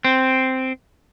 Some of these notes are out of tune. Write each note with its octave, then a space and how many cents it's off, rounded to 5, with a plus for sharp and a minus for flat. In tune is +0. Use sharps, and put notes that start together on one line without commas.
C4 -5